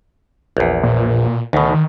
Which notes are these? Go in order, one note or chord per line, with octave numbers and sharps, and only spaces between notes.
A#1 E2
A#2
D2 B2 D#3